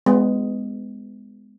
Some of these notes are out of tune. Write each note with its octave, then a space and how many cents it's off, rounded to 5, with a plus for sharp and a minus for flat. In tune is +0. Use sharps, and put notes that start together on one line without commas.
G#3 +0 B3 +25